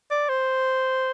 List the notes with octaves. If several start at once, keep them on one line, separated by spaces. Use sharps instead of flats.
D5
C5